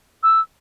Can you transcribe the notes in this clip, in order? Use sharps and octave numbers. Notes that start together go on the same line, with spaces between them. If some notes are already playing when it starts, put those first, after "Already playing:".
E6